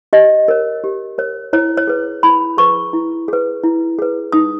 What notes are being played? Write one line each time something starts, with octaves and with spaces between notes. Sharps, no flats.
G4 D#5
A#4 C#5
G4
A#4 C#5
E4 C#5
C#5
G#4 B4
E4 B5
G#4 B4 C#6
E4
G#4 B4
E4
G#4 B4
D#4 D#6